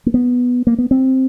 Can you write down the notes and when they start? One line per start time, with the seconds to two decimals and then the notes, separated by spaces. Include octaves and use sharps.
0.06 A#3
0.14 B3
0.67 A#3
0.78 B3
0.91 C4